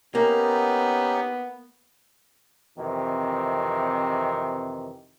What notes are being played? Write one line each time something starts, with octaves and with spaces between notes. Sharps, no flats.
A#3 B3 C#4 D#4 G4
F2 C3 D#3 E3